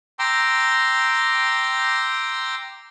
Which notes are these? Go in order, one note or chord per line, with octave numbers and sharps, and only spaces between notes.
G5 A#5 C6 D6 E6